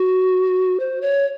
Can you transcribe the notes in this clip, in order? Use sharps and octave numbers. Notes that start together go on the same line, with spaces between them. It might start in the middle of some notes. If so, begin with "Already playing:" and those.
Already playing: F#4
C5
C#5